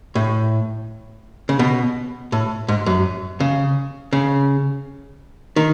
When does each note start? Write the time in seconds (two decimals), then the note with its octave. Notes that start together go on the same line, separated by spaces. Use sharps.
0.15 A2
1.49 C#3
1.59 B2
2.32 A2
2.68 G#2
2.86 F#2
3.40 C#3
4.13 C#3
5.56 D#3